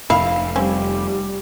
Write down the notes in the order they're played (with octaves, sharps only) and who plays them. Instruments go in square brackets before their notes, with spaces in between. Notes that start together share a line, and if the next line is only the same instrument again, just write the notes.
[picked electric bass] F1 [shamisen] E4 [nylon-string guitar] F5
[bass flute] G3 [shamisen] C4 C#4